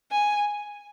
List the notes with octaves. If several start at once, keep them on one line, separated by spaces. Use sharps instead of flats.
G#5